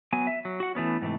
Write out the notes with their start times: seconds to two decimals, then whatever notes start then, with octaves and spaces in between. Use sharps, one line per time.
0.13 F#3 B3 G#5
0.27 E5
0.45 F#3
0.60 F#4 F#5
0.75 E3 A3 B3 C#4
1.02 G#2 C3 E3 A3